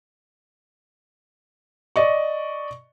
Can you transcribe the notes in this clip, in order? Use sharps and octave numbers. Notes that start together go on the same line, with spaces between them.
D5 D#5 C#6